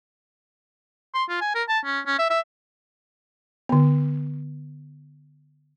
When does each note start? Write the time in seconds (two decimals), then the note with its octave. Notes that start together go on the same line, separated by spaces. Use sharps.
1.15 C6
1.29 F4
1.41 G#5
1.55 A#4
1.69 A5
1.85 C#4
2.07 C#4
2.19 E5
2.30 E5
3.69 D3 B3